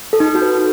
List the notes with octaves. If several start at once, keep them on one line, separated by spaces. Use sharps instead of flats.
A4
D#4
A4
F#4
B4